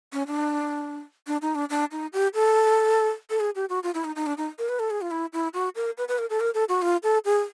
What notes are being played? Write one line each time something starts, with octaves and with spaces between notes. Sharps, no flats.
C#4
D4
D4
D#4
D4
D4
D#4
G4
A4
A4
G#4
G4
F#4
F4
E4
D#4
D#4
D4
D#4
A#4
B4
A4
G#4
F4
E4
E4
F#4
A#4
B4
B4
A#4
A4
A#4
A4
F#4
F4
A4
G#4